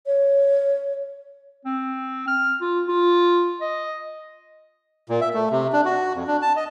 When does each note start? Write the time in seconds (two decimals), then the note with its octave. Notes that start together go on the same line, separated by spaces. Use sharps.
0.06 C#5
1.65 C4
2.28 F6
2.61 F4
2.88 F4
3.61 D#5
5.09 A#2
5.21 E5
5.34 A3
5.51 C3
5.73 D4
5.85 F#4
6.15 F2
6.27 D4
6.42 A5
6.56 D#5